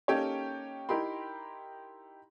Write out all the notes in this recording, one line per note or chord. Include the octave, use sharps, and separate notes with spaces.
A#3 C#4 D#4 G4 A4 C#5
D#4 E4 G4 A#4 B5 C6